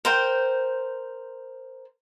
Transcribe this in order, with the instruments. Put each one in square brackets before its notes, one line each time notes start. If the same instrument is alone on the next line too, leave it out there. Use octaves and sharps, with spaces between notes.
[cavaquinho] A#4 C5 G5